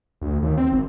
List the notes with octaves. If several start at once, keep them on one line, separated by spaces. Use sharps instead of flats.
D2
D#2
C4
G#1